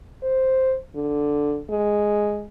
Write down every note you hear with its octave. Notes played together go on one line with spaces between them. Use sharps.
C5
D3
G#3